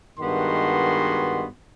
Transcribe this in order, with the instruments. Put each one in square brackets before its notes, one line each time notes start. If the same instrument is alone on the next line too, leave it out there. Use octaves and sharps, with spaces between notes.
[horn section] G2 D#3 G#3 B3 F#4 C6